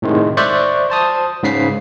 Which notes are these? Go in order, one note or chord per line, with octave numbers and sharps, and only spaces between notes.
A2 C3 D#3 G#3
C5 D5 E5 C#6 F#6 G6
C5 A5 D#6
G#2 C#3 B6 C7